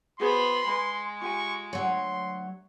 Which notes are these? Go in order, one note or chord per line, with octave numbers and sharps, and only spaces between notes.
B3 F#4 G#4 C5 B5 C6
G#3 B4 B5
F4 G4 G#5 C#6
D2 F#3 C#5 C6